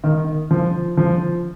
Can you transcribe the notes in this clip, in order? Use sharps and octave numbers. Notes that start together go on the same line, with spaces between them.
D#3
F3
F3